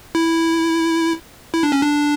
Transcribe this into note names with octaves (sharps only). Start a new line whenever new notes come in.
E4
E4
D4
C#4
D4